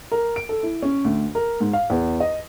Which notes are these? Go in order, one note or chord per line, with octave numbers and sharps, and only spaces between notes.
A#4
D7
A4
E4
C#4
D2
A#4
G#2
F5
E2
D#5